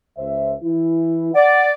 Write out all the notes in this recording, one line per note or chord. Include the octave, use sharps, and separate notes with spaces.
C#2 C5 E5
E3 E4
D5 F#5